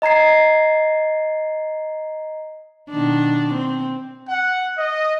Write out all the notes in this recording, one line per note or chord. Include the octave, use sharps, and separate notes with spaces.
D#5 A#5 G#6 C7
B2 D#3 D4
C4
F#5
D#5